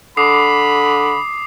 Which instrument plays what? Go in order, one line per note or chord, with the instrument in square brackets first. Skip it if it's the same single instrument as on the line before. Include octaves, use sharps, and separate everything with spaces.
[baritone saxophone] D3 [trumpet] B5 [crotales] D6 D#6 C7